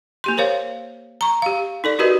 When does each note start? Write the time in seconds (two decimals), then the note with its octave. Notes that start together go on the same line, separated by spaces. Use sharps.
0.24 A#3 G4 C6
0.37 A#4 C5 C#5 F5
1.21 A#5 C#6
1.42 G4 F5
1.84 D#4 A4 D5
1.99 D#4 F#4 G4 A#4 B4 D#5